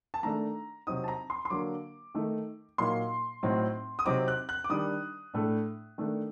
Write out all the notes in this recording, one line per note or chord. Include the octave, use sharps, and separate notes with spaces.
A5
D#3 A3 D4 A#5
C3 F#3 C4 D#4 D#6
A5
A#5
C6
C6
D3 F#3 A#3 D6
D#3 A3 D#4
A#2 F#3 A#3 D#4 C6
A2 F#3 C4 D#4
D#6
C3 F#3 C4 D#4 D6
F#6
F#6
D6
D#3 G3 D4 D#6
A2 A3 D4
D#3 A3 D4